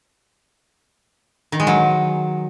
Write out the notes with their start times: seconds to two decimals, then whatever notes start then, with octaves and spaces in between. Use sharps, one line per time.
1.52 D#3
1.60 G#3
1.67 F#3